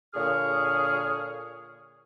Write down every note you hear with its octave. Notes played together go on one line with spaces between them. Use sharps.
A#2 D3 G#4 C#5 D#6 F6